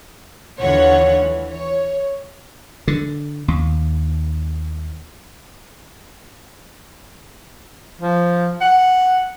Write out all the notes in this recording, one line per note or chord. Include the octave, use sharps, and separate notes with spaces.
D#2 D3 E3 F4 C#5 F#5
E3
C#5
D3
D#2
F3
F#5